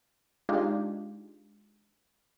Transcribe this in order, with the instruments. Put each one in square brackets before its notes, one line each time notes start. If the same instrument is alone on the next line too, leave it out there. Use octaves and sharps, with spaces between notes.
[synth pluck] G#3 D4 D#4 F4 G4